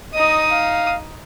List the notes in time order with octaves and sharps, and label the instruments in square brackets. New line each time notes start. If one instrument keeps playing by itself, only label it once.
[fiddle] D#4 D#6 [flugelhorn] D#5
[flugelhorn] F5